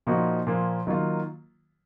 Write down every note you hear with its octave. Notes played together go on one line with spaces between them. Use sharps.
A#2 F3 A#3 D#4 F#4
A#2 F3 A#3
D#3 F#3 A#3 F4